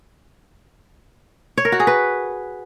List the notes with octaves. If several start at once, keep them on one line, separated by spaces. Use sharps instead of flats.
C#5
A#4
F#4
G#4
B4